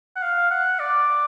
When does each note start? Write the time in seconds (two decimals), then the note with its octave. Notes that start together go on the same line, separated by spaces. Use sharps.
0.16 F#5
0.22 F5
0.51 F#5
0.80 D5